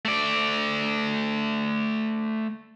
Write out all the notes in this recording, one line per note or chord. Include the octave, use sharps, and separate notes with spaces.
A3 D5